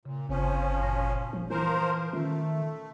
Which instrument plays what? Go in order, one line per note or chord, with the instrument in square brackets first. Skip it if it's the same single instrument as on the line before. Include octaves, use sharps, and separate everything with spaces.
[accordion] A#2 [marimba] C#3
[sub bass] G1 [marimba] C#3 C4 [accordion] F3 C#4
[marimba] F#2 A#2 A#6
[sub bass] F3
[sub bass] E3 [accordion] F3 A#4 C5 [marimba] E4
[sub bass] D#3 [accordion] A3 [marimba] C#4 F4